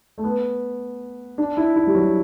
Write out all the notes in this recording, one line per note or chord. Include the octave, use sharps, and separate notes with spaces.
A3
B3
D4
E4
E4
G3
F#3